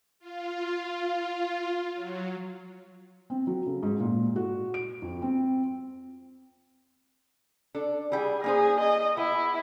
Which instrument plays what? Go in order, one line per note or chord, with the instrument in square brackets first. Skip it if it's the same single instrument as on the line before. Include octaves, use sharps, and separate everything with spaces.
[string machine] F4
F#3
[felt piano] C4
F#3
C#3
G#2
A#2
F#4
D7
F2
C4
[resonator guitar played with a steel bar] D4 A4
[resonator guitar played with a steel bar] G3 E4 G5 [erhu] G#4
[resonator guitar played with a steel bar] A#3 D#4 C5 [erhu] G#4
[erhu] D#5
[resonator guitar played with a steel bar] B3 [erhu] E4